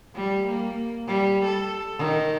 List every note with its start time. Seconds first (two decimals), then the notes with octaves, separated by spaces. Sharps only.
0.15 G3
0.47 A#3
1.08 G3
1.45 A4
1.98 D#3